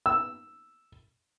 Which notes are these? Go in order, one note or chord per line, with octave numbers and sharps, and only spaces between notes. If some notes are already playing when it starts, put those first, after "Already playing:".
E6